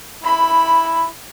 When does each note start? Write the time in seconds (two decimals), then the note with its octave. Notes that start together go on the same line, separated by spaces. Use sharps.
0.24 E4 B5